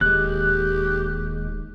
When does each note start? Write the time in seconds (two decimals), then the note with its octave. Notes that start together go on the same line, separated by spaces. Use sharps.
0.01 D1 D#2 G#3 G4 F#6